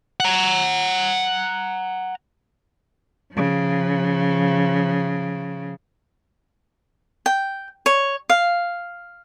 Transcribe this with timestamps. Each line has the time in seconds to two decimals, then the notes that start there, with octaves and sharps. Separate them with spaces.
0.20 F#5 A#5
3.32 C#3 F3
7.26 G5
7.86 C#5
8.30 F5